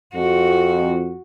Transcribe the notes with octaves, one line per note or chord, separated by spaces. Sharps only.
F2 F#4